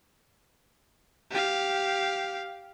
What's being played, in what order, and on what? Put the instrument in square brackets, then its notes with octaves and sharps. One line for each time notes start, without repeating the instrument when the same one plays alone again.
[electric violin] G4 F5